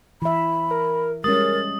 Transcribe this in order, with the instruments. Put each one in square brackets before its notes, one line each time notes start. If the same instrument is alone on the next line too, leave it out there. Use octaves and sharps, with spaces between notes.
[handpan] E3 E5 [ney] B5
[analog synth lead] A#4
[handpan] G3 G#3 C#4 [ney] A#4 [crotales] D#6 [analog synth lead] A6